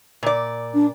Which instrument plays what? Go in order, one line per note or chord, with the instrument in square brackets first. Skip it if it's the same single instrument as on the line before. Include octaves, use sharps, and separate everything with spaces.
[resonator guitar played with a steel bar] A#2 D5
[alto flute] D4